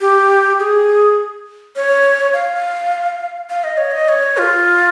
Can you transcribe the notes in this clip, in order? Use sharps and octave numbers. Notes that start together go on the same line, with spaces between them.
G4
G#4
C#5
F5
F5
D#5
C#5
D#5
C#5
F4